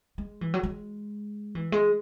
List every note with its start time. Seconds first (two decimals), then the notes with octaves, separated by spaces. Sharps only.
0.18 G#3
0.41 E3
0.54 F#3
0.63 G#3
1.55 E3
1.72 G#3